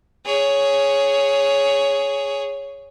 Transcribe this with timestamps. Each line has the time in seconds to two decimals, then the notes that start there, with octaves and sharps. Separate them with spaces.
0.26 G#4 C#5